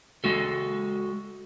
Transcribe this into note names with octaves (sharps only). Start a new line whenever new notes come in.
G#3 F#4 A4